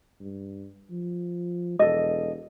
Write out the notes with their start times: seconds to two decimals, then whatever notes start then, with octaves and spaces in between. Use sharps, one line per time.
0.20 G2
0.91 F3
1.79 E1 A4 D#5